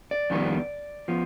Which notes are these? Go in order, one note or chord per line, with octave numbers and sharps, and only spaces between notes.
D5
F2 D#3 G3 B3
F3 B3